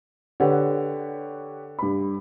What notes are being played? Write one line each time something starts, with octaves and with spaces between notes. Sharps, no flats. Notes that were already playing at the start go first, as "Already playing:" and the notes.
D3 G4 B4 C#5 F#5
G2 B5